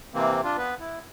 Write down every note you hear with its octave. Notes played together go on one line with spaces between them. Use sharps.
C3 E3 A#3 C4
D4 F4
B3 B4
E4